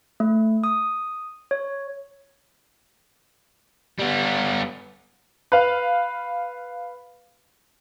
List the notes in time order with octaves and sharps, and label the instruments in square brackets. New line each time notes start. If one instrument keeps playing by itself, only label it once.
[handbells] A3
D#6
C#5
[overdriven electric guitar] G3 B3
[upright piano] B4 F5